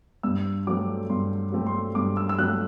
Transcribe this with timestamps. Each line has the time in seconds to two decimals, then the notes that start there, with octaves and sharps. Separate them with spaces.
0.23 G2 E6
0.67 F#3 A3 C4 D6
1.10 G2 C6
1.52 F#3 A3 C4
1.67 C6
1.95 G2 D6
2.17 E6
2.29 E6
2.39 F#3 A3 C4 F#6